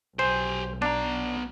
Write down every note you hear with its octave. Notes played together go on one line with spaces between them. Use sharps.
B1 G4 C5 G#5
B3 D4 A#5